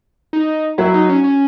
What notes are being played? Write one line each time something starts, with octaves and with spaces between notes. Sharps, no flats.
D#4
F#3 E4
D#4
C#4
C#4